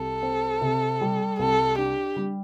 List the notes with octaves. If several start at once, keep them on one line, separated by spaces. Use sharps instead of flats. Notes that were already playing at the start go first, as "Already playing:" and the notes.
Already playing: C2 A4
C4
C3
G3
C2 A4
D4 G4
G3